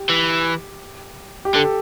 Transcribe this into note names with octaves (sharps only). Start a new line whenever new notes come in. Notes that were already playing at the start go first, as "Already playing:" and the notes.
Already playing: G4
E3
G4
D3 A4